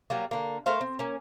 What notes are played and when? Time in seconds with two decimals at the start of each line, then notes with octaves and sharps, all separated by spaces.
0.10 F#3 G3 A#3
0.31 D3 A#3
0.66 A3 A#4 C5 F5
0.81 C4
0.99 A#3 C#4